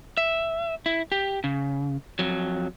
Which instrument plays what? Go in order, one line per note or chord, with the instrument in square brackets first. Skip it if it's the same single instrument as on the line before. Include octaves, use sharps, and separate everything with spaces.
[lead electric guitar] E5
E4
G4
C#3
F2 F#3